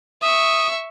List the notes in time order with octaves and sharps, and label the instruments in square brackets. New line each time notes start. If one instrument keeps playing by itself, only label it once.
[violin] E5 C#6 [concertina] D#6